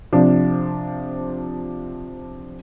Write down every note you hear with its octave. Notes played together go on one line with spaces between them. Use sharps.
C3 F3 D4